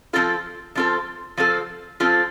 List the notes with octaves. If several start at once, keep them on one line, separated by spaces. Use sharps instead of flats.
F3 C4 F4 A4
F3 C4 F4 A4
F3 C4 F4 A4
F3 C4 F4 A4